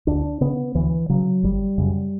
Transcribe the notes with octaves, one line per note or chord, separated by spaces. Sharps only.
D2 D4
C#3 B3
D2 E3
C#3 F#3
G1 G3
F#2 C#3